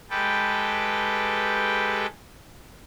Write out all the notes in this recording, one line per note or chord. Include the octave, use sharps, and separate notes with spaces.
G#3 G4 A4 B4 G5